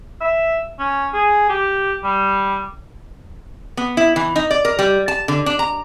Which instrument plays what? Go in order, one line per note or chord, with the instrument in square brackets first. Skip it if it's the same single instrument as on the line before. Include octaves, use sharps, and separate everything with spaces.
[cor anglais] E5
C#4
G#4
G4
G3
[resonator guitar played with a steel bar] B3
E4
E3
D#4
D5
A#4
G3
A5
D3
D4
A#5